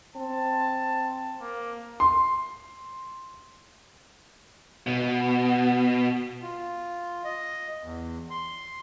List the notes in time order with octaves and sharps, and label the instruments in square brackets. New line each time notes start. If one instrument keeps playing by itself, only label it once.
[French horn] C4 [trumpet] A5
[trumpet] A#3
[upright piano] C6
[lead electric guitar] B2
[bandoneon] F4
D#5
E2
C6